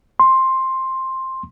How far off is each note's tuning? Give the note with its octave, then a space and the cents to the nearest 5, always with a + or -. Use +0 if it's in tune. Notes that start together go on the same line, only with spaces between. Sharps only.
C6 +10